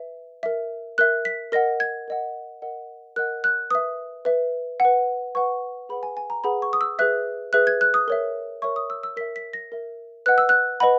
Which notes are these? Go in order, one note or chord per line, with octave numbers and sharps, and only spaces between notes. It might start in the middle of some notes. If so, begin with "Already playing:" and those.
Already playing: B4 E5
A#4 E5
A#4 E5 F#6
B6
A#4 D#5 F#5 A#6
G#6
A#4 D#5 F#5
A#4 D#5 F#5
A#4 D#5 F#5 F#6
F#6
B4 E5 D#6
B4 E5
B4 F#5
B4 F#5 C#6
G#4 B4 F#5 B5
G#5
G#5
A#5
G#4 B4 F#5 B5
C#6
D#6
E6
G#4 B4 E5 F#6
G#4 B4 E5 F#6
G#6
F#6
D#6
A#4 C#5 E5
A#4 C#5 E5 C#6
D#6
E6
E6
A#4 E5 B6
B6
A#6
A#4 E5
B4 D#5 F#5 F#6
E6
F#6
B4 D#5 F#5 B5